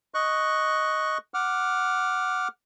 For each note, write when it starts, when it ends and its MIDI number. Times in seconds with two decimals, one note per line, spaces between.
0.14 1.18 75
0.14 1.18 85
0.14 1.18 90
1.34 2.48 78
1.34 2.48 86
1.34 2.48 89